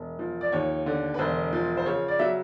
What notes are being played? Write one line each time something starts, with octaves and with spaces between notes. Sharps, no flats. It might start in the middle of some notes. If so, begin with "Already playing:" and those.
Already playing: E1
F3
D5
D#2 C#5
D3
B4
E1 C5
F3
C5
C#3 C#5
D5
F#3 E5